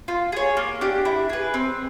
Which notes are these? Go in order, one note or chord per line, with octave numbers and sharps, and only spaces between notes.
F4
G#4 C#5
A#3
D4 G4
E4
G#4 B4
C4